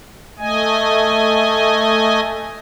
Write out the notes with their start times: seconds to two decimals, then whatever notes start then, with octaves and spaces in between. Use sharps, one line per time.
0.39 A3 D#5 G#5